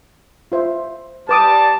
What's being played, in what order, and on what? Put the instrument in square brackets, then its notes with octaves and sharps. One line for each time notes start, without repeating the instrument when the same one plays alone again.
[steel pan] F4 C5 E5
[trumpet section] G3 A5 [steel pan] B4 D6 D#6